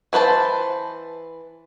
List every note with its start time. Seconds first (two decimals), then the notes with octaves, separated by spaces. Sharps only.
0.13 E3 B4 C5 A5